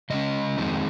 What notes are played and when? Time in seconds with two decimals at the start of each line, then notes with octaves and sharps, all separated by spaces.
0.10 C#3 G#3 C#4 D#5
0.58 F2 D#3 G#3 C4